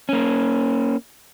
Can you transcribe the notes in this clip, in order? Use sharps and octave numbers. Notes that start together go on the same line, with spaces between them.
A#3 C#4